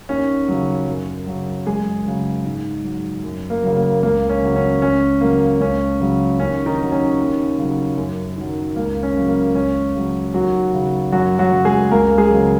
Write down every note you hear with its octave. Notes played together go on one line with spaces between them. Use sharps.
D#2 C#4
C#3 F#3
F#2
C#3 F#3
F#2 G#3 G#4
C#3 F#3
G#2
F#3
F#2
A#3
C#3 F#3
A#3
C#2 A#3
C#4
C#3 F#3
C#4
C#2 C#4
C#3 F#3 A#3
C#2 C#4
C#3 F#3
D#2 C#4
D#3 D#4
D#3 F#3
C#4
D#2
C#3 F#3
F#2
D#3 F#3
C#2 A#3
C#4
C#3 F#3
A#3
C#2 C#4
C#3 F#3
D#2 F#3 F#4
C#3 F#3
F#2 F#3 F#4
F#3 F#4
C#3 F#3
G#3 G#4
C#2 A#3 A#4
G#3 G#4
C#3 F#3